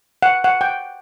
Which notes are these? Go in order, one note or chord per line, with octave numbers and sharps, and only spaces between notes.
F#5
F#5
G5